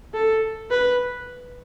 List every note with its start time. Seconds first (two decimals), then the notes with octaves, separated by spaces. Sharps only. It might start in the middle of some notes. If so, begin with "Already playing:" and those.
0.14 A4
0.71 B4